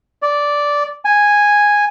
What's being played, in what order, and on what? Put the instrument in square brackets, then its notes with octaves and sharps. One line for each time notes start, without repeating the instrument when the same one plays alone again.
[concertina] D5
G#5